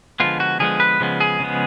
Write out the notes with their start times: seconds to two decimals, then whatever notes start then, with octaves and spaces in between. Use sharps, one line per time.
0.20 D3 F3 G#3 B3 F4
0.40 F#4
0.59 D3 F3 G#3 B3 G#4
0.80 B4
1.00 C#3 F3 G#3 B3
1.20 G#4
1.40 C#3 F3 G#3 B3